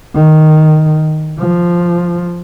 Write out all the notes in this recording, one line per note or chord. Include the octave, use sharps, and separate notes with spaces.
D#3
F3